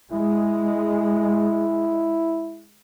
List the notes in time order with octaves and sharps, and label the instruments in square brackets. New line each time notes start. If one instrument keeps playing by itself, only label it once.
[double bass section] G#3 [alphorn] E4